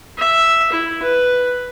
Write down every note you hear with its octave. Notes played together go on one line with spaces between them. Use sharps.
E5
E4
B4